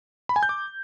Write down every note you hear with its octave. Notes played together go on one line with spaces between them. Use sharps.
B5
G#5
G6
D6